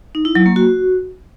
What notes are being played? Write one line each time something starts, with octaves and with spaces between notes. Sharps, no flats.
D#4
E4
F#3
A#3
F#4